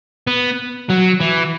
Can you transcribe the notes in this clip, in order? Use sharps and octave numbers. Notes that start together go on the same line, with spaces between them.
B3
F#3
E3